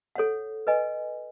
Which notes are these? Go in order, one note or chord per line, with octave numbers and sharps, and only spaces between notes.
A4 C#5 F#5
B4 D#5 G#5